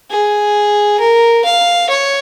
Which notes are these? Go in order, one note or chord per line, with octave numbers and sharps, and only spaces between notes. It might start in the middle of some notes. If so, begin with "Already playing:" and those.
G#4
A#4
F5
C#5